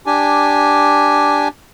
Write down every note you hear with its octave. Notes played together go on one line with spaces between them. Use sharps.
D4 G4 G#5